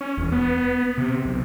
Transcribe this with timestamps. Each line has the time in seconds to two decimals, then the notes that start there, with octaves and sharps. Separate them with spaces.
0.01 C#4
0.17 E1
0.32 B3
0.98 C3
1.25 B1